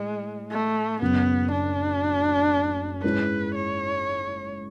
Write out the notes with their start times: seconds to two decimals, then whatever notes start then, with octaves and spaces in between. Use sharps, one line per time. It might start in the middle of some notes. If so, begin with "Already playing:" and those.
Already playing: A2 G#3
0.50 A3
1.01 F#1 F#2 C#3 F#3 B3
1.52 D4
3.03 G#2 G#3 C#4 E4 B4
3.55 C#5